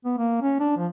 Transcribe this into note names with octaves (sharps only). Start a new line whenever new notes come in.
B3
A#3
C#4
D4
F3